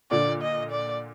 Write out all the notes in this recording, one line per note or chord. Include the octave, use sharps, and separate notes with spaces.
A#2 D3 D5
D#5
D5